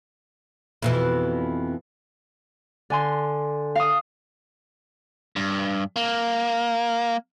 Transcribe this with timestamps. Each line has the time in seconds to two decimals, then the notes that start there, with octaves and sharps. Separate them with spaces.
0.82 F2 B2 E3
2.90 D3 G#5 C6
3.75 F5 D#6
5.36 G2
5.96 A#3